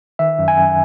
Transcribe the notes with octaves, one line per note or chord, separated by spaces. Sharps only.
D#3 E5
F#2
G#5
F#2